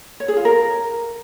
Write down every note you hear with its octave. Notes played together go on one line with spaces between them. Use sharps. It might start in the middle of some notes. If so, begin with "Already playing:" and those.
C#5
G#4
F4
A#4